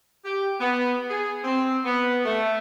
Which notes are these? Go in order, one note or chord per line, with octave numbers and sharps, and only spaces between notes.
G4
B3
G#4
C4
B3
A3